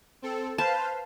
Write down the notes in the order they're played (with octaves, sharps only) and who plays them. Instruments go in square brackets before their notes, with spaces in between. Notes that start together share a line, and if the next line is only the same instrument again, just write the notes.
[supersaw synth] C4 A4
[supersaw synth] B4 C5 F5 [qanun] A5